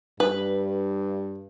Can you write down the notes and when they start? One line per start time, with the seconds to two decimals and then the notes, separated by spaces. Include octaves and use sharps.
0.20 G2 B4